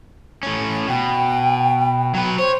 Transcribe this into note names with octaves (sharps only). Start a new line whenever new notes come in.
A2 C#4
B2 G5
F#3 B4
C5 C#5